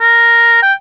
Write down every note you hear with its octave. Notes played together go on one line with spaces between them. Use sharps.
A#4
G5